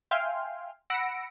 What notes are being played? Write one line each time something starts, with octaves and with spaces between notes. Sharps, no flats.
E5 F5 G5 G#5 C6 F6
F#5 B5 E6 A#6 C#7 D7